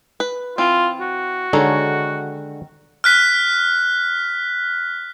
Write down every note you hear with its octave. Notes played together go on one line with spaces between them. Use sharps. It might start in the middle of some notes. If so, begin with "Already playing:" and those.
B4
E3 C4 F4
F#4
D3 D#3 G#3 A4 C#5
F6 F#6 B6